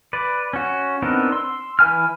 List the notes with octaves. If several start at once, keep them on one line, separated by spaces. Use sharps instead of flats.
B4 D5
C#4 F#4
B3 C4 D4 D#4 A#4
C6 E6
E3 B4 G#5 F6